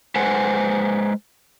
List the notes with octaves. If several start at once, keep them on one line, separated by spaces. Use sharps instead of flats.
G#3 B4 C5 F#5 G#5